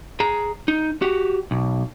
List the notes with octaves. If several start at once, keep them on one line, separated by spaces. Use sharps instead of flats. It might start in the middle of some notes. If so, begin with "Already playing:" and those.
G#4 A#5
D#4
F#4 G4
B1